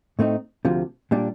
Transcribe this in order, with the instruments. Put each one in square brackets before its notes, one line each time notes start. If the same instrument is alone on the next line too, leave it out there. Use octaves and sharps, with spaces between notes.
[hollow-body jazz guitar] A2 A3 C4 D#4
D2 C3 F3
A#2 G3 D4